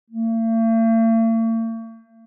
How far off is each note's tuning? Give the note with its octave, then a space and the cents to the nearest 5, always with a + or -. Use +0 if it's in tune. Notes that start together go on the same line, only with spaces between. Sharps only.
A3 +45